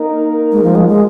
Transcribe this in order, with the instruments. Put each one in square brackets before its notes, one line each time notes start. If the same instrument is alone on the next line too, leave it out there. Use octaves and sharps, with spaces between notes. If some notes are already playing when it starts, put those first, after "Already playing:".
Already playing: [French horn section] A#3 D#4 A#4
[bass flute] G#3
F3
G#3
G#3